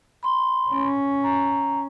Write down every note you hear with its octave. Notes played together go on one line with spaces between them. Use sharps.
B5 C6
C#4
A#5